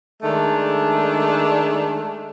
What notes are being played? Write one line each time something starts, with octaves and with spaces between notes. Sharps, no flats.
D#3 G#3 A3 D4